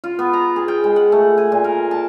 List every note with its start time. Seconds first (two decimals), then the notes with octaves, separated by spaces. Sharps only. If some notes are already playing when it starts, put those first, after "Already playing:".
0.04 F4
0.19 B3
0.33 A#5
0.56 G#4
0.68 G5
0.84 G#3
0.96 F#5
1.12 A3
1.38 G#5
1.52 A#2
1.64 A#4
1.91 A5